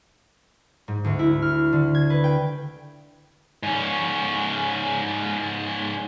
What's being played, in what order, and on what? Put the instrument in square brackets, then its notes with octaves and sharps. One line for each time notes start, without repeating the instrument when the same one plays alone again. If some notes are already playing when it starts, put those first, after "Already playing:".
[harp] G#2
D2
E4
F6
D3
G#6
B4
G5
[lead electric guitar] G#2 C#4